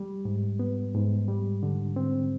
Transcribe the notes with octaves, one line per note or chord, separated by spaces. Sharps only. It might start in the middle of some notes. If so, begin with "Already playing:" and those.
Already playing: G3
G#2
B3
G#2
G3
D3
C4